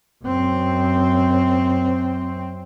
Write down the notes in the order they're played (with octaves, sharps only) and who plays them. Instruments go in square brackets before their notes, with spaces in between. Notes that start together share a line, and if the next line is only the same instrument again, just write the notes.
[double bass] F#2 C4